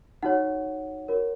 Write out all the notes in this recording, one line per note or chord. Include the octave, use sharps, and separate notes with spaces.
D#4 F#4 C#5 F#5
F#4 A#4 C#5